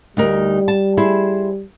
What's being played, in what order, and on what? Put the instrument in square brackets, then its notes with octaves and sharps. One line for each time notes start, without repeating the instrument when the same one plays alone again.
[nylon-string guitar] D2 D#4 A#4 [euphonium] G3
[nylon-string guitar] A5
E4 G#4 C5